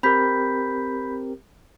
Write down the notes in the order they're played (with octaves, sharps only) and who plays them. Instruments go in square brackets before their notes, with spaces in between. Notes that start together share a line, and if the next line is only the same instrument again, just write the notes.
[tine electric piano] C4 G4 A#4 [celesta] B5 G6 B6